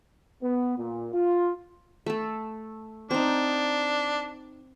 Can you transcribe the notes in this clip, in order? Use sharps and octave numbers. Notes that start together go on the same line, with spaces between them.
B3
A#2
F4
A3 A4
C4 D4 D#4